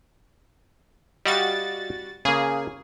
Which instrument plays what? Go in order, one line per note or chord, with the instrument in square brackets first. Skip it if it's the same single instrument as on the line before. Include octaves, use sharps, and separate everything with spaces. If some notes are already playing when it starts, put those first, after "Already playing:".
[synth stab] G3 F#4 A6 [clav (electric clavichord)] D#5 F5
[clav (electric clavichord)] C#3 A#3 [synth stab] G#4